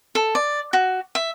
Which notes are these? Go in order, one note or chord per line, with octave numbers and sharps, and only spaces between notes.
A4
D5
F#4
E5